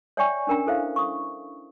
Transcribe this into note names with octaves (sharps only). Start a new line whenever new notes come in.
C#5 D5 E5 G5 G#5 C#6
C#4 D4 A#4 G5 A#5
E4 A4 C5 E5 F5
C#6 D#6